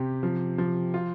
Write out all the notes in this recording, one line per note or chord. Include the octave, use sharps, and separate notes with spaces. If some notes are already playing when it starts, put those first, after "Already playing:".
Already playing: C3 G4
F3
F3
F4